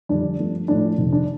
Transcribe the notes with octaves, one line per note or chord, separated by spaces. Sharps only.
F2 D3 G3 D4
G2 F3 A3
A2 F3 A3 D4
F2 C3 D#3
D4